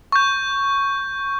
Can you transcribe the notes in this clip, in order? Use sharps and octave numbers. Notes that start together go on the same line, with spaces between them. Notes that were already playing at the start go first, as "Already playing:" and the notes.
C#6 G6